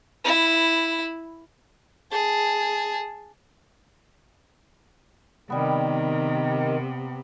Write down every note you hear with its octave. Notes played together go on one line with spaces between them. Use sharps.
E4
G#4 A5
C3 D#3 G3 B3